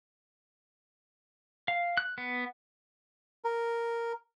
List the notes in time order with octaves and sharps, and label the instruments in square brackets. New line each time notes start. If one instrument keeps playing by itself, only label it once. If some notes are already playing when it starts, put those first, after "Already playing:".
[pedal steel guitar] F5
F#6
B3
[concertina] A#4